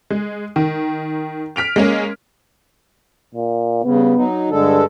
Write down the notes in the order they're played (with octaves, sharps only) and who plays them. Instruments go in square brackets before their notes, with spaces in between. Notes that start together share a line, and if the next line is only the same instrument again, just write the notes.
[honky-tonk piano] G#3
D#3
F6 B6 D7 F7
G#3 A#3 C#4
[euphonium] A#2
[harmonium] G2 C#3 [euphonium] B3
[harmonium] F#3 D#4
[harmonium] G2 G#3 A4 [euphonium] D3